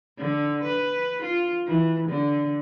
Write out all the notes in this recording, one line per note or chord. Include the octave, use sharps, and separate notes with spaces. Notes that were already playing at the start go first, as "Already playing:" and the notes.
D3
B4
F4
E3
D3